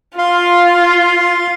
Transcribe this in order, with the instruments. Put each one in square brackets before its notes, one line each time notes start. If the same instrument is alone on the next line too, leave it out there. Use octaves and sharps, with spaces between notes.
[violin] F4 [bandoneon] F5 C6